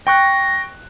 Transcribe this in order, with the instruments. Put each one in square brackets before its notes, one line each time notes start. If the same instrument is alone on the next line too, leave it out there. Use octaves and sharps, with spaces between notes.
[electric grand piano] G5 C#6 F#6 [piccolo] A#6